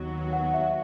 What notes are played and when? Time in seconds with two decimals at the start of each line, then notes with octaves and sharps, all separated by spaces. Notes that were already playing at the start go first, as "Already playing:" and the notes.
Already playing: D#2 D#3 F#3 B3 F#4
0.33 F#5
0.54 E5